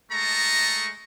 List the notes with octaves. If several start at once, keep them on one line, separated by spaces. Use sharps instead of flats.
G#3 A3 D#5 A5 A#5 C#6